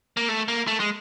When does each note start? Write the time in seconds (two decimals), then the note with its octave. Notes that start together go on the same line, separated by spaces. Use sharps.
0.17 A#3
0.28 A3
0.48 A#3
0.67 A3
0.80 G#3